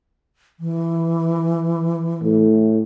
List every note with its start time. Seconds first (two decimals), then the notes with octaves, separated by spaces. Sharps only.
0.60 E3
2.23 A2